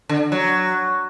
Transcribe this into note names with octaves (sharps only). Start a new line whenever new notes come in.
D3
F#3